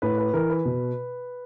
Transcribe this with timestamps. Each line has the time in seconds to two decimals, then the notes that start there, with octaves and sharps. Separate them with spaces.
0.02 A2 B4
0.18 B4
0.33 E3 A#4
0.50 B4
0.65 B2